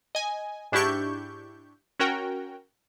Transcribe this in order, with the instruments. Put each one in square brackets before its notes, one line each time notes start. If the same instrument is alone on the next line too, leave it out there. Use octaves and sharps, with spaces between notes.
[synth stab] D#5 G#5
G#2 D4 E4 G4 C#6 G6
C#4 F#4 A#4 G5